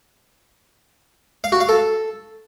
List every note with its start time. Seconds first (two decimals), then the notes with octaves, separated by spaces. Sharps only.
1.44 F5
1.52 F#4
1.61 F5
1.69 A4